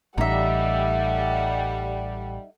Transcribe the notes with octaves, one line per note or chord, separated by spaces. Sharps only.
A1 G3 A3 D#4 E5 F#5